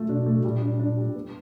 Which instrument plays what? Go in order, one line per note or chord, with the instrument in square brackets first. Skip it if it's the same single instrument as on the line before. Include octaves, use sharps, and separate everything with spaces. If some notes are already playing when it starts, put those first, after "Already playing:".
Already playing: [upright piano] A3 F4
[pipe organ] B2 [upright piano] D4
[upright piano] A3
[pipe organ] A#2 [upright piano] G3
[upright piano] D4
D4
G3
B3